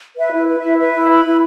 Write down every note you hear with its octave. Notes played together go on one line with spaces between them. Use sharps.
B4 E5
E4
B4
E4 E5
B4 E5
E4
B4 B5
E4